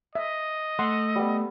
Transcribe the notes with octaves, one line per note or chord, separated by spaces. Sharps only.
D#5 E5
A3 F#5 C6
G3 B3